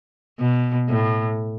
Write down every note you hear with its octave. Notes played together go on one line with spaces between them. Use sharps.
B2
A2